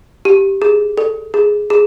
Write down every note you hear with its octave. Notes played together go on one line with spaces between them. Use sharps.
G4
G#4
A4
G#4
G#4